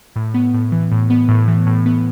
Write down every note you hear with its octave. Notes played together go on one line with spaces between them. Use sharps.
A2
B3
A2
E3
A2
B3
A2
E3
A2
B3